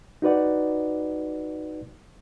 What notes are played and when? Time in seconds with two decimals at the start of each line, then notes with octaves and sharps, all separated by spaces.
0.22 D#4 F#4 B4 D5 F#5